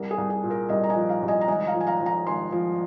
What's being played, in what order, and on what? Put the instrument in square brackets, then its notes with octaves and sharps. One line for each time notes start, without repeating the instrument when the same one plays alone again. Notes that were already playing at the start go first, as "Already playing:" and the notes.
Already playing: [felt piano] C2 A#4
G#4
C2
G#4
A#2
A#4
C2 D#5 G#5
A#5
D#5 G#5
F3
F5 A#5
C2
D#5 G#5
A#5
G#1 D#5 G#5
F5 A#5
F3
G#5
F5 A#5
F3
F5 A#5
G#1 G#5 C6
F3